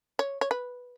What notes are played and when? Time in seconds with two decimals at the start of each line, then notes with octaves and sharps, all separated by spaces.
0.19 C#5
0.41 C#5
0.51 B4